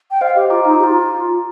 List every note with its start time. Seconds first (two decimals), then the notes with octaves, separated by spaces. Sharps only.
0.11 G5
0.21 C5 D#5 F5
0.35 G4 C5 D#5
0.50 F4 A#5 D6
0.65 D#4 A#5 D6
0.79 G4
0.84 F4